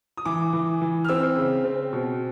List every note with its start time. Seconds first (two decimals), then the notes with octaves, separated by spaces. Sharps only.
0.17 D#6
0.25 E3 D6
0.53 E3
0.81 E3
1.05 F6
1.09 C4 E6
1.36 C#3
1.65 C4
1.93 B2